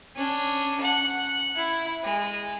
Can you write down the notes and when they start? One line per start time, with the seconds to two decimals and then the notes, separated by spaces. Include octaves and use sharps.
0.16 C#4 D4
0.81 F#5
1.56 E4
2.04 G#3